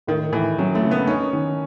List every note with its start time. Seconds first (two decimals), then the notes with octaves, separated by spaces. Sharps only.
0.07 A2 D#3
0.32 A2 E3
0.58 F#2 F#3
0.75 A3
0.83 C#3
0.91 B3
1.07 C#4 D#4
1.33 D#3